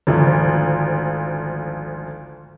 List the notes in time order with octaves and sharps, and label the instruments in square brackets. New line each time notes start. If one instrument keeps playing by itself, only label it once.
[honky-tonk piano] G#1 D2 F3